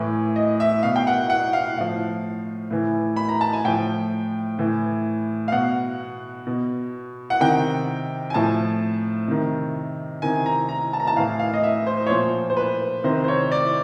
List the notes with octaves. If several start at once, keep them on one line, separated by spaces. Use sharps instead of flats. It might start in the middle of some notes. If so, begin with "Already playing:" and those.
Already playing: A2 E3
D#5
E5
B2 F5
G5
F#5
F#5
F5
A2 F3 F5
A2 E3
B5
A#5
A5
G#5
A2 F3 G5
A2 E3
F5
B2 F#5
B2
F#5
C3 D#3 G5
G#5
A2 F3 A5
C3 D#3
C3 D#3 G#5
A#5
A#5
A5
A#5
A5
A2 E3 F5
F5
D#5
E5
C5
C#5
A#2 F3 C5
C5
B4
C3 D#3 C5
C5
C#5
D5